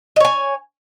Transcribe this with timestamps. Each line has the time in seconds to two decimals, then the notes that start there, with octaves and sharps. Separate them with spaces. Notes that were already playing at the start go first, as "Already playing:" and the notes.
0.16 D#5
0.20 C#5
0.25 G#5